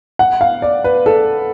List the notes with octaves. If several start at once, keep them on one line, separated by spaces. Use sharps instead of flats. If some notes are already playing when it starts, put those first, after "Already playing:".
F#5
F5
D5
B4
A4